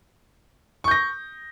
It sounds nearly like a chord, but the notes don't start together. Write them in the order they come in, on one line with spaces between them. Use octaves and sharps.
C#6 G6 A#6